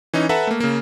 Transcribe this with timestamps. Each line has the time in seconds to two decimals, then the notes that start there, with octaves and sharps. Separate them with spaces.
0.13 E3 C#4 D#4
0.29 A4 B4 E5 F#5 A5 A#5
0.47 A3 A#3
0.60 C#3 A#3